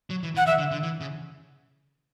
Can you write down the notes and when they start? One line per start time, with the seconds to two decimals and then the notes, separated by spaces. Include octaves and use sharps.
0.10 F#3
0.23 E3
0.35 E3 F#5
0.47 E3 E5
0.58 D3
0.71 D3
0.83 E3
1.00 C#3